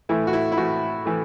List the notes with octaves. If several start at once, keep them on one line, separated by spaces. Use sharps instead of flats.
A2 E3 A3 E4
F#4
E4
E4
A2 E3 A3 F#4
A2 E3 A3